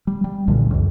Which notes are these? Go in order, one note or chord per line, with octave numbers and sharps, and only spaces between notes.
G3
G3
B1 A#2 D3 E3
C#2 F#2